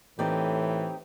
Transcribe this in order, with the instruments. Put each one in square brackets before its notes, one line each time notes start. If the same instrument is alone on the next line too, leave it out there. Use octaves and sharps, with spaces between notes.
[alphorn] A2 [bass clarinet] E3 [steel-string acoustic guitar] C4 D#4 G4